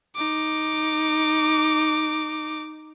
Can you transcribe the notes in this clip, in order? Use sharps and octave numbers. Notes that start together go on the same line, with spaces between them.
D#4 D6